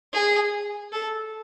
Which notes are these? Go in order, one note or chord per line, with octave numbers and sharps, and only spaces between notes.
G#4
A4